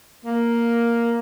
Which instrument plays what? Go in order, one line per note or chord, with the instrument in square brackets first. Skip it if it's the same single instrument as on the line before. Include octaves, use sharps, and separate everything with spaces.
[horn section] A#3